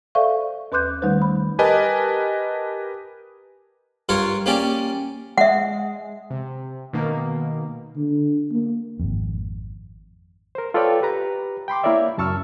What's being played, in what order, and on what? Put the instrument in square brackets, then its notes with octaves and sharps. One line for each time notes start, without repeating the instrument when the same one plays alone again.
[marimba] A4 C5 D5 E5 F5 C#6
D#2 B4 C6 D6 F#6 G6
D#3 G3 A3 D#4 B4 C5
B5
[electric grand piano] G4 A#4 B4 D#5 G#5 A5
[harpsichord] G2 F4 A#4 C#5
A#3 C#4 G4 D5
[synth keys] G#3 [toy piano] E5 F#5
[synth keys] C3
B2 D#3 A#3
[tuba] D3
A#3
[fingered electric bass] G#1 F2
[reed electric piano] A#4 C5
F4 A4 B4 C#5 D5 G5
G4 B4 A#5
G5 B5 C6 D6
A#3 E4 A#4 C#5 D5 E5
C#2 F#2 A5 C#6 E6 F6